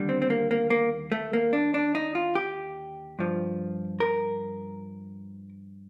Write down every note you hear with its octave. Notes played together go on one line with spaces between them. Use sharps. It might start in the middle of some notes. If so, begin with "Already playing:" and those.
Already playing: D#2 D3 G3
C4
C4
A#3
A#3
A#3
A3
A#3
D4
D4
D#4
F4
G4
G2 F3
A#4